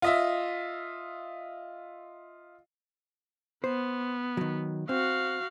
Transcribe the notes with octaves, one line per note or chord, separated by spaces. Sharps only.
F4 D#5 E5
B3 C5
D#3 F#3
C4 F#4 F5